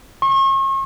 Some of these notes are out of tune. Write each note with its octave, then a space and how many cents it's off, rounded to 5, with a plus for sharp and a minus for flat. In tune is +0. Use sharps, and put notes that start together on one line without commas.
C#6 -40